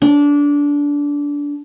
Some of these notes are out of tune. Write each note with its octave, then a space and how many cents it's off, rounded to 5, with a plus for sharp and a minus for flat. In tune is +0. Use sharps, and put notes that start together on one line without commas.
D4 -20